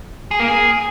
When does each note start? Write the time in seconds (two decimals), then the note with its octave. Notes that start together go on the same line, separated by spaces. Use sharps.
0.31 G#4
0.40 A#3
0.48 G#4